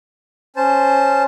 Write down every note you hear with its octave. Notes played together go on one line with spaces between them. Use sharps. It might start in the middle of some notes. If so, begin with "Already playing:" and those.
C#4 C5 A5